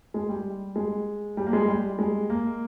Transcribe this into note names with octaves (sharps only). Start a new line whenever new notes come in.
G#3
G3
G#3
G3
A#3
G#3
G3
G#3
A#3